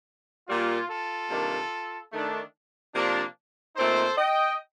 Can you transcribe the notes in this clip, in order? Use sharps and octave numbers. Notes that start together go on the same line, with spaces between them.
A#2 G3 A#3 F4
F4 A4
C3 D#3 G3 A#3 D4
D#3 A3 D4
C3 F3 A#3 D4
A#2 A3 C4 D#4 A4 C5
D#5 G5